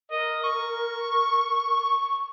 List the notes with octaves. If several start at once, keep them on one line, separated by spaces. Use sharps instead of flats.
A#4 D#5
C#6